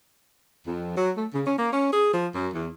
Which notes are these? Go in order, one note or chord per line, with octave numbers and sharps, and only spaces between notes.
F2
F#3
A3
C#3
C#4
A#3
C#4
G#4
F3
F#2
E2